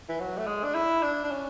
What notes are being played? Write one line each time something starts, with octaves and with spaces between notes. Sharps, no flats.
E3
F#3
A3
G#3
D4
E4
D4
D4
C#4